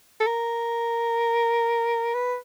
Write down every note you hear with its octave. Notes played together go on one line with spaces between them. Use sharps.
A4
A#4
B4